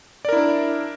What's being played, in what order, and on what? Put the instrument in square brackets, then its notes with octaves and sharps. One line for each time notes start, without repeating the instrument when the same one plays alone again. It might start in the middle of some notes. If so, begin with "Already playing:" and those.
[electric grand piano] D5
A#4
E4
D4